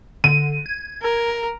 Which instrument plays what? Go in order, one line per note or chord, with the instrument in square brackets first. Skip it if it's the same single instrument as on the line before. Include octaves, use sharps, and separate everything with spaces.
[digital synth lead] D3 [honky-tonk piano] D#7
[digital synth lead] G#6
[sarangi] A#4